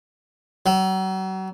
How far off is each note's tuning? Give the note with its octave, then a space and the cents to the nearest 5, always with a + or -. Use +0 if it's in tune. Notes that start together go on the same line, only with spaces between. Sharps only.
F#3 +40